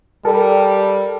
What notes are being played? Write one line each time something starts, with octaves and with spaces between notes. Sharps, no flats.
G3 A4 A#4